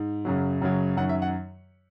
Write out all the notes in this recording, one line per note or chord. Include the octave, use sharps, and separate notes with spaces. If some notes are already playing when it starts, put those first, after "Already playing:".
Already playing: G#2
F#2 C#3 F#3
F#2 C#3 F#3
F#2 D#3 F#3 F#5
E5
F#5